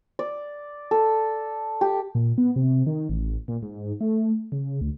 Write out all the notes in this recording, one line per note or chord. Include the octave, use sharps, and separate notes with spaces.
D5
A4
G4
A#2
B3
C3
D#3
A1
A#2
G#2
A3
C#3
D2